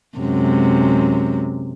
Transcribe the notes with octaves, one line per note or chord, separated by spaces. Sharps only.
F#2 C3 G#3